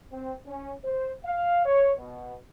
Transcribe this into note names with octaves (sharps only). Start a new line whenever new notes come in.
C4
C#4
C5
F5
C#5
B2